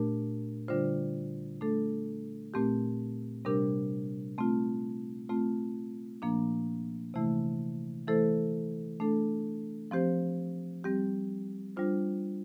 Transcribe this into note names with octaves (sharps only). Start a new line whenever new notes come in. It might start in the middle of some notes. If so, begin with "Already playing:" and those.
Already playing: A#2 A3 D4 G4 A#4
D3 G3 D4 F4 C5
A3 D4 A4
A#2 A3 C4 G4
C3 G3 D4 G4 A#4
A3 C4 F4
A3 C4 F4
A#2 F3 A#3 D4
C3 E3 A3 E4
E3 A3 E4 A4 C5
A3 D4 A4
F3 C4 G4 C5
G3 C4 G4
G3 D4 F4 C5